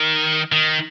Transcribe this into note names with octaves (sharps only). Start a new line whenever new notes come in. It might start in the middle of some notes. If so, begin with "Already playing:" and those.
Already playing: D#3
D#3